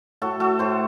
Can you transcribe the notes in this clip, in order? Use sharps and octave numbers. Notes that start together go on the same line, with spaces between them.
A2 F#4 A4
F#4 A4
A2 A4 C5